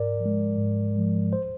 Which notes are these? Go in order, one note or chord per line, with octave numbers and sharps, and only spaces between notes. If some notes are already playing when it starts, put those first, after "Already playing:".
Already playing: G#2 A#4 D5
F3
G#3
G#2
F3 G#3
C5